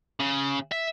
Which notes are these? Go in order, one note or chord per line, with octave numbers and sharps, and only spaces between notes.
C#3
E5